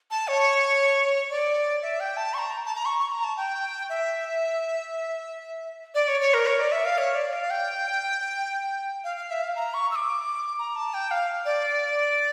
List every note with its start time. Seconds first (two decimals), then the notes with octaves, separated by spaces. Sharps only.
0.11 A5
0.28 C#5
1.31 D5
1.82 E5
2.00 G5
2.17 A5
2.34 C#6
2.38 A#5
2.65 A5
2.75 A#5
2.85 C#6
2.99 C#6
3.12 A#5
3.24 A5
3.37 G5
3.89 E5
5.95 D5
6.08 C#5
6.21 C#5
6.34 A#4
6.47 C#5
6.60 D5
6.72 E5
6.85 F5
6.98 C#5
7.15 D5
7.33 F5
7.50 G5
9.04 F5
9.17 F5
9.30 E5
9.43 F5
9.56 A#5
9.74 C#6
9.91 E6
9.96 D6
10.59 A#5
10.76 A5
10.94 G5
11.11 F5
11.45 D5